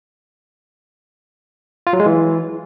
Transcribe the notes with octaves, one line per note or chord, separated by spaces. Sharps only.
F4
F#3
G#3
E3